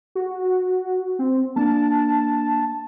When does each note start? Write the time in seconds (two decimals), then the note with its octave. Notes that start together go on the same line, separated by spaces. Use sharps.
0.15 F#4
1.19 C4
1.56 A#3 D4 A5